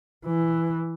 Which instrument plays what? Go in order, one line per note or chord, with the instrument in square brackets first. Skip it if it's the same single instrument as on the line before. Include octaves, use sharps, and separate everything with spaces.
[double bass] E3